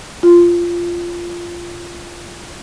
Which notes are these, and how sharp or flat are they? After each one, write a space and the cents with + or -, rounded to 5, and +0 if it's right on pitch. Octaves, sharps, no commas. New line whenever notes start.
F4 -10